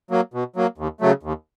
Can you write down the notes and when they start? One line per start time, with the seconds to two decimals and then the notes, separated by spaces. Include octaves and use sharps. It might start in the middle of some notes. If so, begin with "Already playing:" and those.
0.11 F#3 A#3
0.34 B2
0.56 F#3 A#3
0.78 D#2
1.01 C#3 F#3 A3
1.23 D#2